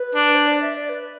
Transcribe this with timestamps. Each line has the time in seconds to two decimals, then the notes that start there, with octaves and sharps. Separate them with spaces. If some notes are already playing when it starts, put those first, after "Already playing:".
Already playing: B4
0.15 D4
0.33 C5
0.47 D5
0.61 E5
0.76 D5
0.89 B4